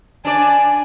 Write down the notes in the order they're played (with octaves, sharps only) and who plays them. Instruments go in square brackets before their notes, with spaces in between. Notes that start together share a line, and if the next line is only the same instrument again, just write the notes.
[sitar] D4 D5 [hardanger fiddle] G#5